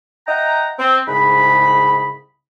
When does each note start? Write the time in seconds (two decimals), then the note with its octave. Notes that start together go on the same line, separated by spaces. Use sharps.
0.27 D#5 E5 F#5 G5 A#5
0.79 C4
1.08 C2 G#2 C#3 B5